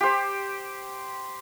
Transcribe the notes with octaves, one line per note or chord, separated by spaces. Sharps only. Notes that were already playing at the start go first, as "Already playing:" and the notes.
G4 C5